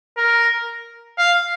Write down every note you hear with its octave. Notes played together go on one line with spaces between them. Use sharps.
A#4
F5